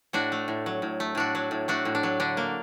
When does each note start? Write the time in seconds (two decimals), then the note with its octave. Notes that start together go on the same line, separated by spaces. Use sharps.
0.13 A2 D4 F#4
0.32 A3
0.48 A2
0.66 F#3
0.82 A2
1.00 A3
1.15 A2 D4 F#4
1.35 F#3
1.51 A2
1.68 A3 D4 F#4
1.85 A2
1.95 D4
2.03 F#3
2.20 D3 D4
2.37 A#3